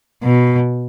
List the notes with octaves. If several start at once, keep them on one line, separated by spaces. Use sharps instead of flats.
B2